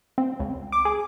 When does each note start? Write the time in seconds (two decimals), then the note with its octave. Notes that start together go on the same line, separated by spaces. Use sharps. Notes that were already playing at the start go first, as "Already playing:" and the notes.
0.18 C4
0.40 C#2
0.72 D6
0.85 G#4